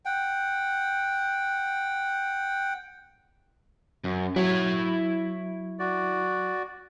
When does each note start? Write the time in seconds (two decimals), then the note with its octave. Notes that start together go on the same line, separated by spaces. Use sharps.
0.05 F#5 G5
4.04 F#2
4.36 F#3 E4 C#5
5.79 F#4 D5